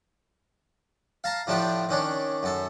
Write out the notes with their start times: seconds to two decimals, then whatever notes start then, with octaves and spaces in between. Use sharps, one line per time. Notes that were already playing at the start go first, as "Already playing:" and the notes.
1.24 F5 A5 A#5
1.47 A2 F3 A3 D4 G4
1.89 D#3 C#4 D4
2.43 F#2 A4